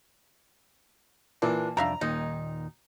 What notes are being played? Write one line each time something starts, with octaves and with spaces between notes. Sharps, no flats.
A#2 E3 A#3 D4
C2 F2 G3 D4 E5 F5 A#5
D#2 A#2 D#3 D#4